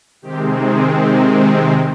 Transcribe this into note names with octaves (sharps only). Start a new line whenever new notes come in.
C3 D#3 G#3 C4 G4
G#4